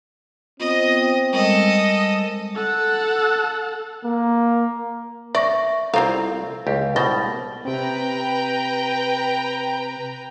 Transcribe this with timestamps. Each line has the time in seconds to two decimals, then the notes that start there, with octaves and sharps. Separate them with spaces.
0.60 B3 C4 F4 D#5
1.33 G3 G#3 A4 A#4 D#5
2.55 A4 F#5
4.04 A#3
5.35 D5 E5 C#6 A#6
5.94 C2 C4 E4 F4 A4 F5 A#5
6.67 C#2 G4
6.96 C2 B2 G3 C4 A6 A#6 G7
7.65 C3 C4 B4 G5 A#5